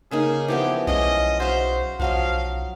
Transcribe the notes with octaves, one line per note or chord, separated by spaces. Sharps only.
C#3 A#3 D#4 G#4
E3 F3 B3 G4
B1 G#3 C#4 D#5 C6
F#4 C5 E5 F5
B1 F3 F#3 D#5 F5